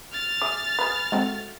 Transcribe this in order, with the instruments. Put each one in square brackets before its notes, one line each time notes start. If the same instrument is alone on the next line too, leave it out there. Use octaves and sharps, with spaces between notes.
[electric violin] F6 A6
[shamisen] G#4 E5 [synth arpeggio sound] D6 D#6
[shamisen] G#4 B4
[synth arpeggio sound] G#3 C4 [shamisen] A3 F#4